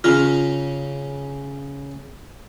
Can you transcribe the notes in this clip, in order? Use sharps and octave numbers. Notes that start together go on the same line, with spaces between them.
C#3 C#4 F4 A#5